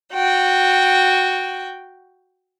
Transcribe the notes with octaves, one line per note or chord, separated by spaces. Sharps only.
F#4 G5